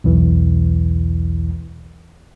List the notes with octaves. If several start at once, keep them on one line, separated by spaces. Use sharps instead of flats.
B1 E2 E3